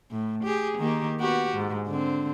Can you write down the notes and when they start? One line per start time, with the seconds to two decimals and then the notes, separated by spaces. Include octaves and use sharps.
0.11 A2
0.43 G4 G#4
0.78 D#3 A#3 G4
1.20 B3 F#4 G4
1.55 G#2
1.87 D3 C4